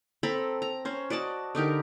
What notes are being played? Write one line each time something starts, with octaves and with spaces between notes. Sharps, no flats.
C4 A4 A#5 B5
A#5
C#4 C5
F#4 D5 D#5 A5
D3 D#4 G4 A#4